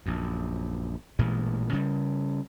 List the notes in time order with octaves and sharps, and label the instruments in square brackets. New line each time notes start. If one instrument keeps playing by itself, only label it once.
[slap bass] A#1 F#2
A1 A#2 E3 G#3
C#3 G3